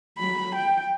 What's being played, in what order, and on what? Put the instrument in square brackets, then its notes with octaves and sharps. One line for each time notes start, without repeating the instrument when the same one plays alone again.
[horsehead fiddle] F#3 B5
G5